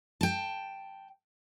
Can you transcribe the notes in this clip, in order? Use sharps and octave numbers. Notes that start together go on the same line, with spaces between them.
G5 A5